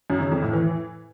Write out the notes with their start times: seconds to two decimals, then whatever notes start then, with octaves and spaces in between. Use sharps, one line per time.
0.10 F#2
0.21 C#3
0.31 F2
0.42 A2
0.53 E3